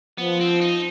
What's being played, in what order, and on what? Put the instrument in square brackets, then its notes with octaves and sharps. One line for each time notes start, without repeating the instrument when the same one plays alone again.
[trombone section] F3 [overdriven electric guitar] B3
[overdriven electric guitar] C4
D#4